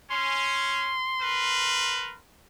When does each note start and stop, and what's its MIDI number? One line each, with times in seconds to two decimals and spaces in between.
0.11 0.97 61
0.11 2.19 84
1.21 2.17 70
1.21 2.17 71